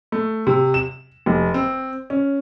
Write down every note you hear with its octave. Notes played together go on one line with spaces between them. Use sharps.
A3
C3
E7
F1
C4
C#4